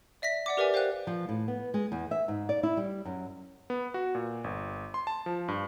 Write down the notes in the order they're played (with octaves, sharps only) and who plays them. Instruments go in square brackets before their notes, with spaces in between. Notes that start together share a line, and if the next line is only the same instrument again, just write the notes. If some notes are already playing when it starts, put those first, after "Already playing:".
[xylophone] D5 E5 A#6 B6
D5 F#5 D6
G4 A#4 B4 D5 E5 G#5
C5 F5 G5 G#5 F#6
[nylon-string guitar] F3
A2
B3
G#3
E2
E5
G#2
D5
E4
G3
F#2
[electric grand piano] B3
F#4
A#2
G1
C6
A5
F3
G2